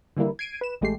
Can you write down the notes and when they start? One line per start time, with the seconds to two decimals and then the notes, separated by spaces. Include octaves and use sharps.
0.17 D3 E3 G3 A#3 E4
0.39 G#6 C7 D7 D#7
0.61 B4 E7
0.81 A1 G#3 A3 G4 C7